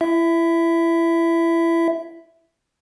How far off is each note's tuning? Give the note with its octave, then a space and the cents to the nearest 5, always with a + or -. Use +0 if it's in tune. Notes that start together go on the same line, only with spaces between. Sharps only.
E4 +25 E5 +0